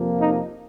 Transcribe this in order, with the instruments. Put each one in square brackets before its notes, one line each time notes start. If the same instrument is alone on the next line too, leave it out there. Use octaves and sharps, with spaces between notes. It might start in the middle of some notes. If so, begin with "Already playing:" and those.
Already playing: [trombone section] F2 C3 F3 A#3
D#4